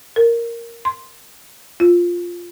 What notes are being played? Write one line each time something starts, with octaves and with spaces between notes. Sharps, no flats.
A#4
C6
F4